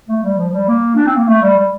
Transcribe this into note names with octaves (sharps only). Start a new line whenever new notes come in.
A3
G3
F3
G3
A#3
D4
C4
A#3
A3
G3
G3